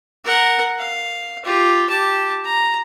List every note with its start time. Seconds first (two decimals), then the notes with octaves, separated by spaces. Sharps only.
0.24 A#4 F#5
0.79 F5
1.45 F4 G4
1.89 G4 A5
2.45 A#5